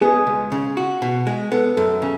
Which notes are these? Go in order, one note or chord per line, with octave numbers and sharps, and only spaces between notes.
B3 G#4
C#2
C#3
F#4
B2
G#3
B3 A4
F#2 A4
C#3